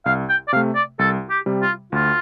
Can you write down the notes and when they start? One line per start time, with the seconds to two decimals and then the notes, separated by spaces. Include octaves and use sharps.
0.05 C2 F5
0.29 G5
0.48 D5
0.53 C3 F5
0.56 A3
0.75 D5
0.99 C2 A4
1.30 G4
1.46 C3 G3
1.62 F4
1.92 D2 F4